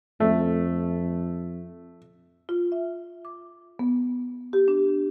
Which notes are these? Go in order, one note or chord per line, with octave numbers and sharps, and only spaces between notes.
F2 A3
F4
E5
D6
B3
G4
D4